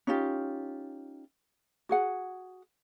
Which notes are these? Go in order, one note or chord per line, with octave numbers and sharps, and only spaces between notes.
C#4 D#4 F4 G4
F#4 G#4 F#5